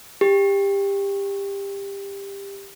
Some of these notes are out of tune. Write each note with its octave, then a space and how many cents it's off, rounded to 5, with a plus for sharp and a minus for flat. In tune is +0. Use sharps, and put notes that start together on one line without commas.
G4 +20